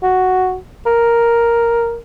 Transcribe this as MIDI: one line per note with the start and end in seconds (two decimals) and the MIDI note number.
0.03 0.56 66
0.86 1.97 70